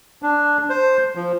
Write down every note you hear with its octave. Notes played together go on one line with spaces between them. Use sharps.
D4
C5
F3